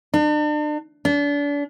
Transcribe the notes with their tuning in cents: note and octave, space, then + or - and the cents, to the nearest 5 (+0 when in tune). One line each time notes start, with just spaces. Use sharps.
D4 +40
D4 -35